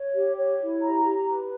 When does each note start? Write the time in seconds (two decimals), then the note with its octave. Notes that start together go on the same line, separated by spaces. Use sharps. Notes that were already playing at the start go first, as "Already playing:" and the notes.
Already playing: C#5
0.14 G4
0.37 C#5
0.60 E4
0.82 G4 A#5
1.04 G4
1.26 B4